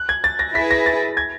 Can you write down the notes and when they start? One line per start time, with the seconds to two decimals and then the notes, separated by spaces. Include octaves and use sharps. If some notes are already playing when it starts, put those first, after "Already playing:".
Already playing: F#6
0.09 G#6
0.24 A6
0.39 A#6
0.55 E4 G#4 B4 B6
0.71 A#6
0.86 A6
1.17 G#6